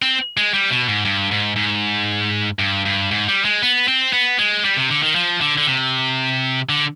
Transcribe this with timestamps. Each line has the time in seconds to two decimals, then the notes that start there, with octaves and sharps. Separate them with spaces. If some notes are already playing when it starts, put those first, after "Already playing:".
0.02 C4
0.37 G#3
0.54 G3
0.71 B2
0.88 G#2
1.05 G2
1.31 G#2
1.56 G#2
2.59 G2
2.86 G2
3.11 G#2
3.28 G3
3.45 G#3
3.62 B3
3.88 C4
4.13 B3
4.39 G#3
4.64 G3
4.77 C3
4.90 D3
5.03 D#3
5.15 F3
5.41 D3
5.58 D3
5.67 C3
6.69 D3